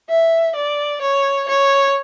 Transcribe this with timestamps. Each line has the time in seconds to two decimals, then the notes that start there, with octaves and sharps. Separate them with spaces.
0.09 E5
0.55 D5
1.01 C#5
1.48 C#5